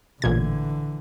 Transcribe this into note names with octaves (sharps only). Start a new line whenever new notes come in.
A1 A#2 D3 E3 G#6